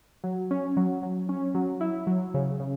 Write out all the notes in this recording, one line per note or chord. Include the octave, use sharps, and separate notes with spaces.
F#3
C#4
F#3
F#3
C#4
F#3
E4
F#3
C#3
C#3